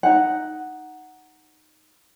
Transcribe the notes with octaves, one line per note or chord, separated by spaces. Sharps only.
D#4 F#5